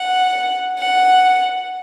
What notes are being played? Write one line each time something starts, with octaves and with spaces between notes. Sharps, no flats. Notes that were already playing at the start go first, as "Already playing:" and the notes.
Already playing: F#5
F#5